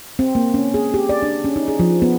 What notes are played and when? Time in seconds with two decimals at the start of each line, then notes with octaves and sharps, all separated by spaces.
0.19 C4
0.35 A#3
0.54 C#4
0.74 G#4
0.94 G4
1.09 D5
1.22 D4
1.44 C#4
1.56 D#4
1.68 G#4
1.79 F3
2.02 B3